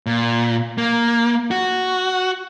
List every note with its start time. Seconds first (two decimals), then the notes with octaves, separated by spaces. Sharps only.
0.06 A#2
0.78 A#3
1.51 F#4